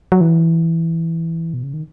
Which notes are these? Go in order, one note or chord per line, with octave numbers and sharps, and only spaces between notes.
F#3
E3
B2
C#3
D#3